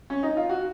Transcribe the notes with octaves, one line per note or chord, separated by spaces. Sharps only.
C#4
D#4
F4
F#4